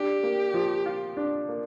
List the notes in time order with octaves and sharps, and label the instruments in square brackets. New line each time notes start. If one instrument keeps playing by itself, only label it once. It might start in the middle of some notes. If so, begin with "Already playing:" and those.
Already playing: [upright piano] D4 [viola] G4
[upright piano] A#3
F3
F4
D4
A#3